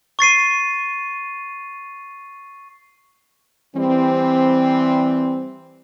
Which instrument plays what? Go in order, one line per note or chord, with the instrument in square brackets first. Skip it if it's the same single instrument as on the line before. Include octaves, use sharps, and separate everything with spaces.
[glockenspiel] C#6 A6 C7 D#7
[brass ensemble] E3 G3 C4